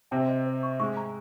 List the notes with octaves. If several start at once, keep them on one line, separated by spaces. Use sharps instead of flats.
C3 C4 G5
D#5
C5
C#6
G#2 G#3 C#6
A#5